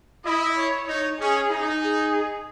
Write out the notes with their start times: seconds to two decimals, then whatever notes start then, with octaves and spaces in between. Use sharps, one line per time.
0.25 E4 D#5
0.57 C#5
0.87 D#4 C#5
1.19 C#4 G#4
1.51 D#4
1.82 G#4